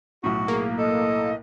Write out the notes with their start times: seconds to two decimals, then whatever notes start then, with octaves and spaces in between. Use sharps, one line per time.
0.24 B1 A2 F#4
0.48 A#3 G#4
0.78 A4 D#5